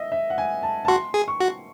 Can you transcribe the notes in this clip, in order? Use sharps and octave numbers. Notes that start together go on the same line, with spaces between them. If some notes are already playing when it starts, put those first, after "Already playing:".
Already playing: D#5 E5
E5
F#5
G#5
A5
A5
F#4 C6
G#4
C#6
F#4